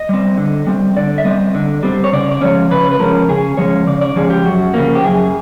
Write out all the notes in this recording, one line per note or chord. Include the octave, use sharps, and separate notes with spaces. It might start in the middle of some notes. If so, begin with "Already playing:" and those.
Already playing: D#5
G3 C4
D3
G3 C4
D3 D5
E5
G3 C4 D#5
D3
G3 C4
C#5
C#3 D5
D5
F3 G#3 C#4 C#5
C#3 B4
B4
F3 G#3 C#4 A#4
C#3 G#4
F3 G#3 C#4 C#5
C#3 D5
D5
F3 G#3 C#4 G#4
G4
F#2 F#4
C#3 F3 A#3
G4
F#2 G#4